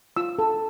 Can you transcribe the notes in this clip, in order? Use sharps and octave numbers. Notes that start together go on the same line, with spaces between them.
F4 E6
A4